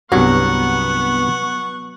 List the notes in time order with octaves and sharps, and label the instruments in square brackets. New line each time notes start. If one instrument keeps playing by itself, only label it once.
[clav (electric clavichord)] C2 G2 [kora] F#3 [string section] B3 [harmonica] F#5 C#6